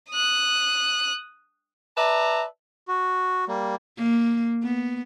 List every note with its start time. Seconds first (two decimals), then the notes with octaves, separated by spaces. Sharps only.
0.10 D#6 F#6
1.98 B4 D5 E5 A5 A#5
2.88 F#4
3.48 G3 A#3
3.97 A#3
4.63 B3